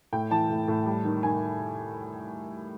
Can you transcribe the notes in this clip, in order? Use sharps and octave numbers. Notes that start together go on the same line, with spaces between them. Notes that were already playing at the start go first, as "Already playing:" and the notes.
A2 G5
E3 A5
A2
A2
G3
D#3
D#3 G#5